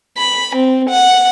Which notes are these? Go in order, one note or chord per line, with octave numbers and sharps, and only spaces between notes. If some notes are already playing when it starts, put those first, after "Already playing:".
B5
C4
F#5